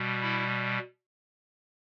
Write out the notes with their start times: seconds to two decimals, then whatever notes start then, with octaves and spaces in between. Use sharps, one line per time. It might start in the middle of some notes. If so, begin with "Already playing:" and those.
Already playing: B2 G3
0.22 E4